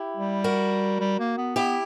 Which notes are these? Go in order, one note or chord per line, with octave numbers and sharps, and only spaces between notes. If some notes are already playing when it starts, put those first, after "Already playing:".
Already playing: E4 G4
G3
F#4 A#4
G3
A#3
B3
B3 E4 G4